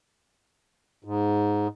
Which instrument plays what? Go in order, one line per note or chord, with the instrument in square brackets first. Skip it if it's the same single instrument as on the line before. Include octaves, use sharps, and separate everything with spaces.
[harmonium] G#2